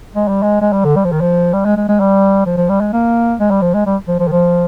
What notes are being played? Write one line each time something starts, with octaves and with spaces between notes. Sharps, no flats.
G#3
G3
G#3
G#3
G3
D3
G3
F3
D#3
F3
G3
G#3
G#3
G#3
G3
F3
F3
G3
G#3
A#3
G#3
G3
F3
G#3
G3
F3
F3
D#3
F3